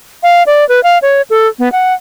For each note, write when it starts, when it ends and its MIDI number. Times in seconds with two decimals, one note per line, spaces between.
0.23 0.43 77
0.47 0.67 74
0.69 0.83 71
0.83 0.98 77
1.02 1.22 73
1.30 1.47 69
1.59 1.71 59
1.72 1.94 78